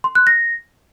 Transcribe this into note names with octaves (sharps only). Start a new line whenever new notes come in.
C6
F#6
A#6